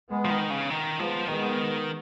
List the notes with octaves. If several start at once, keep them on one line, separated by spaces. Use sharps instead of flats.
G#3 B3
F3
D#3
C#3
D#3
F3 G#3 B3
D#3 G#3 B3